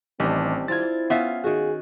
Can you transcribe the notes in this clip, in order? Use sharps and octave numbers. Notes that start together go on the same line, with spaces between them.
A1 D#3 G3 C4 D4
C4 E4 F4 G#6 A6
B3 C#4 F4 E5 F5
D#3 F#4 G#4